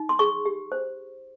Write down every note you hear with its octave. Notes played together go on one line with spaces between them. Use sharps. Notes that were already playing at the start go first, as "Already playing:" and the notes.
Already playing: D#4
C6
G#4 C#6
G4
C5